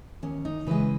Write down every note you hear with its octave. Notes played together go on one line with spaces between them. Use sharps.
D#2 C#4
D#4
C#3 E3 G#3 B4